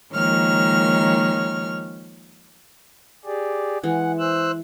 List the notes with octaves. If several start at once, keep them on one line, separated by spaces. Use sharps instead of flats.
D#3 F3 G#3 A#3 C#5 F6
G4 G#4 D5
E3 G#3 F#5
C5 E6 F#6